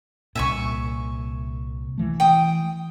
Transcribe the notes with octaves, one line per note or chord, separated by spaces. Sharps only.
C2 A#2 E5 G#5 C#6
E3 A3
G5 D#6